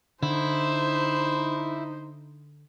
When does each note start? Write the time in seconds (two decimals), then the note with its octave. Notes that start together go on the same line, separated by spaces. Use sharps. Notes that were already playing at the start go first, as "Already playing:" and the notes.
0.23 D3 D#4 E4 C5